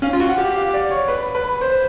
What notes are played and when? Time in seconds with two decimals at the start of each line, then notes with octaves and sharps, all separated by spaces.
0.02 C#4 F5
0.13 F4
0.20 F#4
0.29 F#5
0.38 G4
0.56 F5
0.73 D5
0.91 C#5
1.08 B4
1.35 B4
1.61 C5